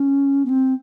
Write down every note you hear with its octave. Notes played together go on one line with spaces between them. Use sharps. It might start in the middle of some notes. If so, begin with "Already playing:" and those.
Already playing: C#4
B3
C4